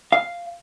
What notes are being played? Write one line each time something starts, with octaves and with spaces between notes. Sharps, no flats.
F5